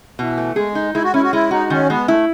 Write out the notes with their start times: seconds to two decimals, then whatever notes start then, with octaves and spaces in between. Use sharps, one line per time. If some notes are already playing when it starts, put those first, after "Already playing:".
0.18 B2 E3
0.38 A3
0.56 G#3 G#4
0.75 D#4
0.94 G#3 E4
1.04 F#4
1.13 C#4 E4
1.23 F#4
1.33 G#3 E4
1.51 D#4 F#4
1.70 D#3 C#4
1.90 G#3 B3
2.08 A3 E4